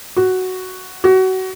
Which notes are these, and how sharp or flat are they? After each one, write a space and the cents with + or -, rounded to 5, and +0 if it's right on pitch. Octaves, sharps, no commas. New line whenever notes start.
F#4 +5
F#4 +25